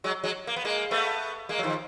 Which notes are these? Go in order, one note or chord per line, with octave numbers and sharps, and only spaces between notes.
F#3 G#3
F#3 G#3
A#3
B3
G#3 A#3
A3 B3
G#3 A#3
F#3
D#3 F3